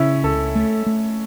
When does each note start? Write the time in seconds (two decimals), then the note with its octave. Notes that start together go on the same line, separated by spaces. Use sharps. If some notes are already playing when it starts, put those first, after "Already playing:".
Already playing: C#3 C#4 E4
0.24 C#2 A4
0.55 A3
0.86 A3